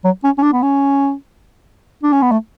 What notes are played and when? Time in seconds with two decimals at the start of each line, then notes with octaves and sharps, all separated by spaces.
0.04 F#3
0.24 C#4
0.38 C#4
0.43 D4
0.53 B3
0.62 C#4
2.03 D4
2.12 C#4
2.22 B3
2.31 A3